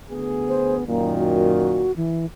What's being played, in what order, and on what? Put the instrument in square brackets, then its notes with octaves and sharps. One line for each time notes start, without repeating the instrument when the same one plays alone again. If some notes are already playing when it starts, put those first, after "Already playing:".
[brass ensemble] D2 B3 G#4
[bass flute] C5
[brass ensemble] F#2 A#2 D#3 [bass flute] A#3
[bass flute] F#4
E3